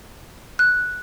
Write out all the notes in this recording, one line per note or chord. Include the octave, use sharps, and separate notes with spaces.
F#6